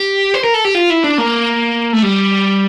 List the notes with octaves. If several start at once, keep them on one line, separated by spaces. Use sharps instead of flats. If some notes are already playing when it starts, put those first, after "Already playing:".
Already playing: G4
C5
A#4
A4
G4
F4
E4
D4
A#3
A3
G3